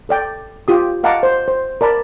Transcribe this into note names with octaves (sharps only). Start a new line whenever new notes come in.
A4 D5 G5
F4 G4 D#6
D#5 F5 F#5 A5 A#5 D6
C5
C5
A#4 D5 A5 B5